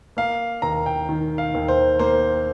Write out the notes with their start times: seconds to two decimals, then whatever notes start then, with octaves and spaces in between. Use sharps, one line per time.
0.17 A#3 F5
0.62 D#2 A#5
0.86 G5
1.09 D#3
1.38 F5
1.54 D#2
1.68 C5
1.99 A#3 C5